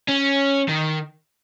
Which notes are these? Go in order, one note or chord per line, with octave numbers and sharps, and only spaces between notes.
C#4
D#3